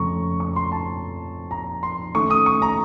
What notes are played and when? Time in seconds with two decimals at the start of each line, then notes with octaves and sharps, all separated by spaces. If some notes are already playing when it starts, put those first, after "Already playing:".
Already playing: F2 C#3 A3 C#4 A#5 C#6
0.40 C#6
0.56 C6
0.72 A5
1.51 A#5
1.83 C6
2.15 D#3 A3 C#4 C#6
2.30 D#6
2.46 C#6
2.62 A#5